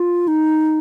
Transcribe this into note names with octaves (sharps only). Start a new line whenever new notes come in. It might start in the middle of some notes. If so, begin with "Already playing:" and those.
Already playing: F4
D#4